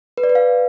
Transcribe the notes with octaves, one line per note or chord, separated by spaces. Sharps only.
B4
D5
B4
F5